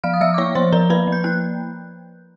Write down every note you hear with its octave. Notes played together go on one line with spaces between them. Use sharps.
F3 F5 F6
D#6
F3 E5 E6
D6
A#3 C#5 C#6
F3 C5 C6
F3 A#4 A#5
A#3 B4 B5
F3
G6
A#3 F#6